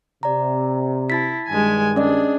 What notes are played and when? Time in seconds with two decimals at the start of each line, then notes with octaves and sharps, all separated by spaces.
0.23 C3 D5 A#5
1.10 E4 A5 A6 B6
1.48 G2 D#3 G#3 G#5
1.96 C#4 D4 G#4 D5 D#5